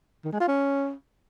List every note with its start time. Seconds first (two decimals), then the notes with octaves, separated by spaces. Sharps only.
0.25 D#3
0.32 G#3
0.40 F4
0.48 C#4